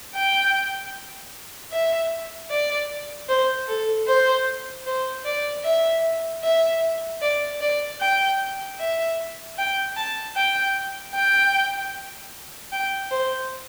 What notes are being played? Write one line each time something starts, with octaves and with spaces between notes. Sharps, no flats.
G5
E5
D5
C5
A4
C5
C5
D5
E5
E5
D5
D5
G5
E5
G5
A5
G5
G5
G5
C5